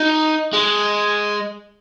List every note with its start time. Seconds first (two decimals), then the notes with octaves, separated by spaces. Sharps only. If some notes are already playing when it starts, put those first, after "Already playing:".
Already playing: D#4
0.53 G#3